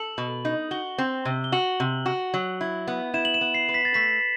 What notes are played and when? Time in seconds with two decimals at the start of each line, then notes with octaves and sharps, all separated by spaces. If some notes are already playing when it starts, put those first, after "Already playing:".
Already playing: A4 F#7
0.18 B2
0.45 D#4
0.71 F#4 G7
0.98 C4
1.25 C3
1.44 G7
1.52 F#4 F#7
1.80 C3
2.06 F#4
2.34 F#3
2.61 E4
2.88 B3
3.14 E4 E7
3.25 F#7
3.34 E7
3.41 B3
3.54 C7
3.69 B4
3.74 B6
3.85 A6
3.94 A3 B6